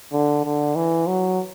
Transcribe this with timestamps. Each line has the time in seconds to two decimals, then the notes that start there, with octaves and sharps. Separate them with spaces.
0.13 D3
0.45 D3
0.76 E3
1.07 F#3